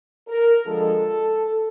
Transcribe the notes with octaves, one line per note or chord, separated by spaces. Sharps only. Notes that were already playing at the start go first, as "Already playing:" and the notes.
A#4
D3 F3 G#3 A4